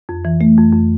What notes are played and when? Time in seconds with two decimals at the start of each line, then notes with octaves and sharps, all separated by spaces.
0.09 F2
0.25 E3
0.41 A3
0.58 F2
0.73 F2